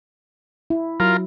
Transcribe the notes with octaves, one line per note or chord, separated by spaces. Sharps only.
E4
F#3 F4 A#4